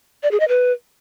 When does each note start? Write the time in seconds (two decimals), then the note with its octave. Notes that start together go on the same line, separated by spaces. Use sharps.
0.23 D5
0.31 G#4
0.40 D#5
0.48 B4